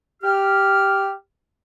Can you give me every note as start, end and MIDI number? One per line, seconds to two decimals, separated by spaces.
0.23 1.11 67
0.23 1.11 89